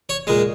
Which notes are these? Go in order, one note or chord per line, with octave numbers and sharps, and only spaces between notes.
C#5
A#2 G#3